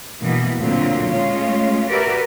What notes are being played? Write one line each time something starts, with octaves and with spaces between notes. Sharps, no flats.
G2 B2 E3 A#3 B3
D2 A#2 D3 F#3 C4 F4
G#3 A3 C#4 F4
F#4 G4 A#4 B4 D5 E5